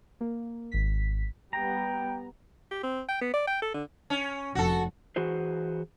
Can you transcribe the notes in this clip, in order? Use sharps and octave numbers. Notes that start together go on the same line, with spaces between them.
A#3
G#1 B6
G3 B3 G5 A#5
G4
C4
G5
B3
D5
G5
A4
D3
C#4
F1 F#4 A4
E3 F#4 G#4 C5